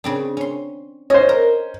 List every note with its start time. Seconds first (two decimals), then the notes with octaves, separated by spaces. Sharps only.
0.04 C#3 C4 D4
0.37 C#4 C6
1.10 C#4 C5 D#5
1.29 A#4